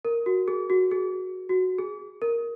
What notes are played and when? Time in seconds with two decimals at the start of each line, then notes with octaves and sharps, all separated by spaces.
0.05 A#4
0.26 F#4
0.48 G#4
0.70 F#4
0.91 G#4
1.49 F#4
1.78 G#4
2.22 A#4